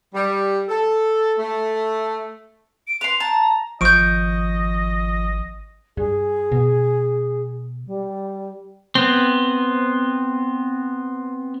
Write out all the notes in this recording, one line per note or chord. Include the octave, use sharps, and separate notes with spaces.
G3
A4
A3
D7
B4 C6 F7
A5 A#5
G#1 F3 D#5 C#6 G6 D7
G2 G#4
B2
G3
B3 C4